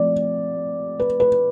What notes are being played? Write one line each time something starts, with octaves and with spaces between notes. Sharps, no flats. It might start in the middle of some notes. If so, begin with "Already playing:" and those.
Already playing: F3 A3 C4 D5
B4
B4